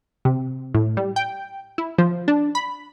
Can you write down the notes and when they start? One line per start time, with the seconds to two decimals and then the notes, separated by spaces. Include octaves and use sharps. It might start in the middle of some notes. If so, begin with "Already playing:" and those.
0.25 C3
0.74 A2
0.97 G3
1.16 G5
1.78 E4
1.98 F3
2.28 D4
2.55 B5